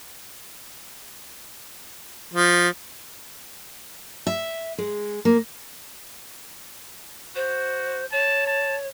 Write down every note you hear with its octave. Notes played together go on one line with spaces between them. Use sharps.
F3
E5
G#3
A#3
F#4 C5
C#5 A5
A5